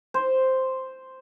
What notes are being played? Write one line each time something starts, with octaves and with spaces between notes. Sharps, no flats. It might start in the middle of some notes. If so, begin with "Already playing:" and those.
C5